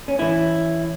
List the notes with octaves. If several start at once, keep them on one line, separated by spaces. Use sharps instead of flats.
C#4
E3 A3 C#4 E4